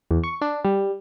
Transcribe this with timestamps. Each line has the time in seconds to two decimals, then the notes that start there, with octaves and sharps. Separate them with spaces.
0.11 E2
0.24 C#6
0.42 D4
0.65 G3